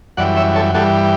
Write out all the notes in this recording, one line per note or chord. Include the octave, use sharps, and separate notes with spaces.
F#2 E3 G3 D5 F#5
C#5 E5
A4 C#5
G2 E3 G3 F#4 A4